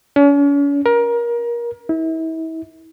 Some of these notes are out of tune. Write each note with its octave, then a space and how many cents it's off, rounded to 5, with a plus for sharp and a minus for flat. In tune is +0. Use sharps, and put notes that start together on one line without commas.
C#4 +40
A#4 +25
E4 -35